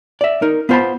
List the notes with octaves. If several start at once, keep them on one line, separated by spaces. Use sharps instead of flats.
D5 E5
D#4 A#4
B3 F4 C5 F#5 A5 B5